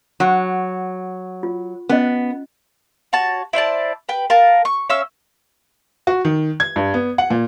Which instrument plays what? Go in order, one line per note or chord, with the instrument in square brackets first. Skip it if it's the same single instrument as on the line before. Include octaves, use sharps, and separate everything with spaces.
[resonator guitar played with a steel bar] F#3 [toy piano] F#5
[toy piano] F4
[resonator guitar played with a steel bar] B3 [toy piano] C#4 D#5
[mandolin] F#4 C#5 A5
E4 C5 D5 A5
B4 G5
A#4 F5 A5
C#6
C#4 E5 F5 E6
[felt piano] F#4
D#3
G#6
G2
B3
F#5
A#2